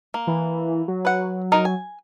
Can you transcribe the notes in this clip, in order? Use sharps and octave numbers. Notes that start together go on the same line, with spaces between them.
A#3
E3
F#3
B4 F#5
D#4 A#4
G#5